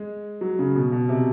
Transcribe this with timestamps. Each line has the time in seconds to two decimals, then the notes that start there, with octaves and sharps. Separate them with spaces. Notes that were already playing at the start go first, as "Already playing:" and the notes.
Already playing: G#3
0.41 F#3
0.59 C#3
0.76 B2
0.92 B2
1.09 C3